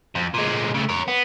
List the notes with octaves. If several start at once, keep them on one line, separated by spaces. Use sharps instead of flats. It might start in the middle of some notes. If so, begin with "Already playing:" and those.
F2
A#2 G#3
C#3 A3
A#4 C#5
B3